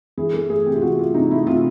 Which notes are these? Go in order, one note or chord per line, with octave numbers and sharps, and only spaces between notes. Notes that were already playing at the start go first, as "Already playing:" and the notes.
E3 G#4
E3 A4
A3 G#4
C3 G4
F4
E3 F#4
A3 F4
C3 D#4
A3 E4
C3 F4